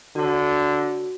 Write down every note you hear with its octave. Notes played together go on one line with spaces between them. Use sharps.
D3 F#4 C#5